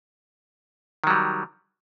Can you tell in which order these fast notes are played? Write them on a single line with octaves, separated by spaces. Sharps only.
D#3 F#3 G3